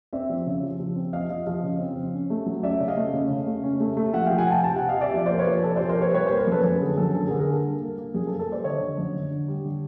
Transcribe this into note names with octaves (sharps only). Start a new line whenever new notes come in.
C4 D5 E5
F3
C#3
F3
F3
C4
F3 D#5 F5
F3 D#5 F5
F3 D#5 F5
C#3
C4
F3
C#4
A3
F#3
C#4 D5 E5
C#3
D#5 F5
A3
C#3
C#3
A3
C#4
A3
A3
F3 E5 F#5
F3 F5 G5
F#5 G#5
C3 G5 A5
C3 G5 A5
C3 F#5 G#5
D#5 F5
C3 D5 E5
F3
A#3 C5 D5
B4 C#5
F3
C3 A4
F3 C5 D5
A#4 C5
C3 B4 C#5
G3 B4 C#5
A#4 C5
A#3
A#4 C5
F#2 A4 B4
F#2 A4 B4
D3 G#4
F#2 A4
D3 A4
G#4 A#4
D3
G#4 A#4
A#3 A4
G3
A#3
A#3
F#2 G#4
A4
A#3
A4
G3 C5 D5
D3 C#5 D#5
D3
F#2
D3
D3
G3
D3